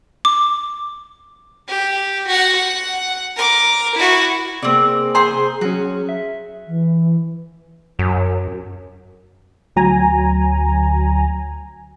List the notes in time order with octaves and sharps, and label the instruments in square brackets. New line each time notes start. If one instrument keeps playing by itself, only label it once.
[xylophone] D6
[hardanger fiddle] G4
F#4 F#5
F#5
A#4 D6
E4 F#4
[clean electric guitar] C3 A#3 [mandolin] C4 D5 [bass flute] G#4
[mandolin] C5 G#5 D#6 [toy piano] A#5 C6
[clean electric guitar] F#3 C#4 [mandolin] F#4
[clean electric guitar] E5
[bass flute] E3
[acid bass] F#2
[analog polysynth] D2 F#3 G#5 A#5